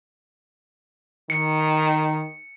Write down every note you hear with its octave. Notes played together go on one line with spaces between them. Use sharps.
D#3 C#7